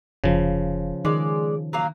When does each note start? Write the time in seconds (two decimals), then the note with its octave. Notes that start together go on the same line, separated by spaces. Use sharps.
0.24 F1 C#3 F3
1.05 D#3 G#3 D5
1.73 F#3 A#3 F5